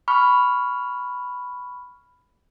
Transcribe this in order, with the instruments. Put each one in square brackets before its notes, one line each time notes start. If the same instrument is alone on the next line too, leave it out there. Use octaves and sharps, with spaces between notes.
[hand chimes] B5 C#6 F6